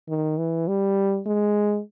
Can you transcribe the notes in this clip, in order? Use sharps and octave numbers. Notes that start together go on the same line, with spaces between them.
D#3
E3
G3
G#3